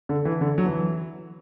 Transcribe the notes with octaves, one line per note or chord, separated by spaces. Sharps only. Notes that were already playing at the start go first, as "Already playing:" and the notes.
D3
E3
D3
F#3
E3